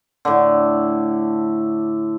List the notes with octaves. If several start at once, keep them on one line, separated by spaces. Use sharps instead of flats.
A2 D3